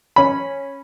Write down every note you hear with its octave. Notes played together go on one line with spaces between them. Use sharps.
C#4 B5